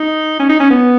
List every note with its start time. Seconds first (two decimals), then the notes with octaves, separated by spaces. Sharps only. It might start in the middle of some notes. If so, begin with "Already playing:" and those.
Already playing: D#4
0.40 C#4
0.49 D#4
0.60 C#4
0.71 B3